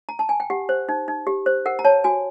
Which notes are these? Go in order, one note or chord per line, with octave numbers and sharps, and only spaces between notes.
A#5
A5
G#5
G5
G4 F#5
C5
D#4
D#4
G4
C5
A#4 F#5
A#5
C#5 A5
F#4 G#5